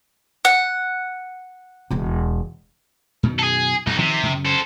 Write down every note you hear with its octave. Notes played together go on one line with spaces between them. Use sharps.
F#5
E1 E2
F#2 B2 D#3
G#4 A4
B1 F#2 D#4
C3 D#3 F3 C4
F#2 C#3
A4 C5